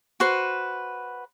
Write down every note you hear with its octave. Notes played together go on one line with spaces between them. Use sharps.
F#4 B4 C5